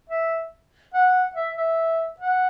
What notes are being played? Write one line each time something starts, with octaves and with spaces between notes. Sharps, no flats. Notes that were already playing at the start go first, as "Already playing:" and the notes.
E5
F#5
E5
E5
F#5